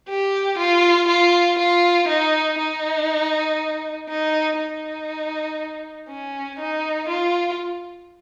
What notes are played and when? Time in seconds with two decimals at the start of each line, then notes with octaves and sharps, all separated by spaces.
0.09 G4
0.59 F4
1.08 F4
1.58 F4
2.08 D#4
2.59 D#4
4.09 D#4
4.58 D#4
6.09 C#4
6.59 D#4
7.09 F4